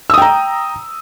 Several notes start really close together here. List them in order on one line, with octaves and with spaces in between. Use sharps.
E6 D#6 G5 A#5